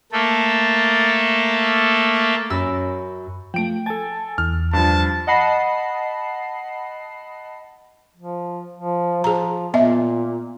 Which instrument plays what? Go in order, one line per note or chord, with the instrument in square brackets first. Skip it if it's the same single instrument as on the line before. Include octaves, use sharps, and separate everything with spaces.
[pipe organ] A3 A#3 A4
[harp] F#2 A#4 B5 E6 A6
[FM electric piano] F3 A3 [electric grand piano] G5 D7
[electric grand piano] A4 A6 [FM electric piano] G#5 A5
[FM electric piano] E2 [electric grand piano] F6
[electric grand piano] G2 F3 [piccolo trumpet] A5
[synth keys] D#5 F#5 A5 B5 C7
[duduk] F3
F3
[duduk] F3 [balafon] G#4 A#5
[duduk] A#2 [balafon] B3 D#5 E5